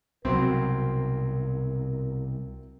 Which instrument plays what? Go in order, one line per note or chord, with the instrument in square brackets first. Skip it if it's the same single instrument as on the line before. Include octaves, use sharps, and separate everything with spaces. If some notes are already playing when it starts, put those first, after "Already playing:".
[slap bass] C2 B2 [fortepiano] F#3 C4 [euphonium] A#4